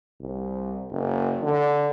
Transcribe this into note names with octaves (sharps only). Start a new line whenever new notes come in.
C2
F#1
D3